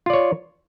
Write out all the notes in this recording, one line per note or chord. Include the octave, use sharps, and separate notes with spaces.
F4 C#5 D5